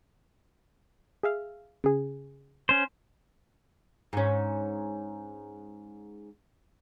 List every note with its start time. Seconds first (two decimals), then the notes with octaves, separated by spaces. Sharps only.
1.23 G#4 E5 F5
1.84 C#3 G#4
2.69 C#4 C5
4.13 G#2 C#4